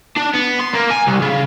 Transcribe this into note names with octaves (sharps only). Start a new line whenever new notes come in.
D4
B3
C6
A#3
G#5
C2
C#3